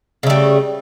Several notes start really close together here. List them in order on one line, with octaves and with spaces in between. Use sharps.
C#3 A3 G3